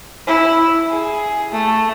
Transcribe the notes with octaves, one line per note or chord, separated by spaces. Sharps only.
E4
G#4
A3